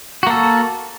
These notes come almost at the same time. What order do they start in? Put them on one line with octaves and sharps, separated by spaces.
F#4 A#3 A4